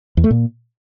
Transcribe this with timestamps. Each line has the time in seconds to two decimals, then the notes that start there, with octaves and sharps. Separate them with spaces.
0.17 E2
0.24 A3
0.31 A#2